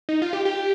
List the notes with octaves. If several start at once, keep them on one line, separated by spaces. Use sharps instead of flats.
D#4
F4
G4
G4